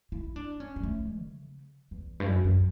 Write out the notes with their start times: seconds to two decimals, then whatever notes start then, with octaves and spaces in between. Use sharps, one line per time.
0.12 E4
0.36 D4
0.60 C#4
0.76 G3
0.83 A3
1.20 C#3
1.91 E2
2.20 G2
2.26 F#2
2.44 F#2